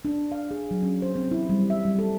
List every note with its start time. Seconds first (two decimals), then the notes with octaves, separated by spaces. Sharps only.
0.05 D4
0.32 F5
0.51 G#4
0.71 F#3
0.83 C#4
1.02 C5
1.16 C4
1.31 E4
1.49 G3
1.70 E5
1.85 G3
1.99 A4